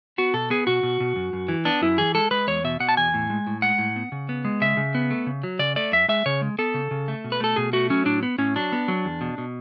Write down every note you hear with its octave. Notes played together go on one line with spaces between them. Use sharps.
B3 F#4
B2 A4
B3 G#4
B2 F#4
B2
B2
F#2
F#2
E3
B3 D4
F#2 E4
E3 G#4
G#3 A4
G#3 B4
E2 C#5
B2 E5
B2 F#5
A5
E2 G#5
A2
G#3
A2
G#3 F#5
A2
B3
C#3
B3
G#3
C#3 E5
C#3
B3
A3
C#3
F#3
C#3 D5
A3 D5
F#2 E5
G#3 E5
C#3 C#5
G#3
B3 A4
C#3
C#3
A3
B2
B4
A3 A4
B2 G#4
A3 F#4
F#3 C#4
A2 D4
B3
A2 C#4
F#3 D4
B3
F#3
E2
B2
B2